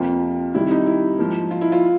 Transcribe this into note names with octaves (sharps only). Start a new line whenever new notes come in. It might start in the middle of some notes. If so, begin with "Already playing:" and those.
Already playing: F2 C3 F3 A#3 F4
C3 D#3 G3 E4
D#4
E4
G#2 F3 A#3
F4
E4
F4